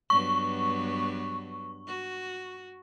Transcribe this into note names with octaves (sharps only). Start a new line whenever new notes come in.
G2 F#3 B3 C#6
F#4